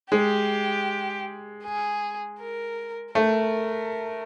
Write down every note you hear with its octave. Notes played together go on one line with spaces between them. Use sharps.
G#3 G4
G#4
A#4
A3 A#4